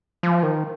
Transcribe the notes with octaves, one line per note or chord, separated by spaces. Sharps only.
F3
D#3